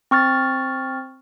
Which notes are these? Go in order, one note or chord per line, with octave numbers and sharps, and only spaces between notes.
C4 C#6 F6 A6